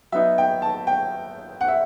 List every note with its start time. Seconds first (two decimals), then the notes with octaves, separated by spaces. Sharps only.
0.12 F#3 B3 D#4 E5
0.38 G5
0.62 A5
0.87 G5
1.61 F#5
1.68 E5